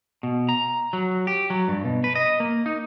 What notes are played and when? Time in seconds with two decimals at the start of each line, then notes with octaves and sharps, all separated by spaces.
0.23 B2
0.49 A#5
0.93 F#3
1.27 G4
1.50 F#3
1.68 G2
1.85 B2
2.04 B4
2.15 D#5
2.40 A#3
2.66 D#4